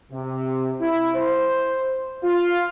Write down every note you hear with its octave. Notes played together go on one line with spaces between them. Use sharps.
C3
E4
C5
F4